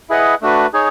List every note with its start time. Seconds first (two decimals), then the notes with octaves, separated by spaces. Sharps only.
0.09 E4 G#4 B4 D#5 F#5
0.41 A3 D4 F#4 B4
0.73 D#4 G#4 C#5